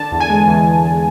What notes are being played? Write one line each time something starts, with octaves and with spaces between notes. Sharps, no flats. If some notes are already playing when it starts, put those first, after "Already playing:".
Already playing: D3 A5
E2
G#5
G#3
E2